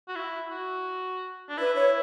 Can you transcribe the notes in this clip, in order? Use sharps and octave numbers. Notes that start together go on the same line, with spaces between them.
F#4
E4
F#4
D4
E4 B4
C#5